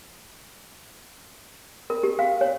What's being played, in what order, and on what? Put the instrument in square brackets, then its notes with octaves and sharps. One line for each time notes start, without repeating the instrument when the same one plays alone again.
[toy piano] A#4
G4
F5
C#5